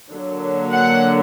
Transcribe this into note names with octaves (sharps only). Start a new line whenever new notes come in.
D3 F#3 A#3
F#5